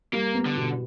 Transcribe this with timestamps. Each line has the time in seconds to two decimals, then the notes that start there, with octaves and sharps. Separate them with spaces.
0.13 G3 A#3
0.34 B3
0.46 D3
0.56 B2